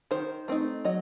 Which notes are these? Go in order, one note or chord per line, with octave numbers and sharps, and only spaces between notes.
D#3 C5
A3 C4 D#4
F#3 D#5